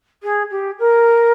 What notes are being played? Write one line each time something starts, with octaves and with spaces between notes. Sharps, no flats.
G#4
G4
A#4